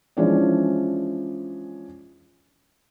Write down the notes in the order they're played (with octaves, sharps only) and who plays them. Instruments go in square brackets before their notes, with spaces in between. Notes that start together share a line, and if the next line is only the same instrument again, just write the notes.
[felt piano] E3 F3 G#3 C#4 D4 D5